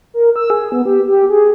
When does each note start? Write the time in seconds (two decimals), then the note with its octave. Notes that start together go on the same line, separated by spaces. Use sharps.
0.14 A#4
0.36 E6
0.50 G#4
0.72 B3
0.85 G4
1.07 G4
1.30 G#4